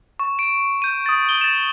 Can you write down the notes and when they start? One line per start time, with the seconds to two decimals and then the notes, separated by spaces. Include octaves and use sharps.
0.19 C#6
0.39 D7
0.82 G6 D#7
1.06 D#6 A6
1.26 D#6 G7
1.41 A6 E7